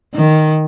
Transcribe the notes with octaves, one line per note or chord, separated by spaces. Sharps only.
D#3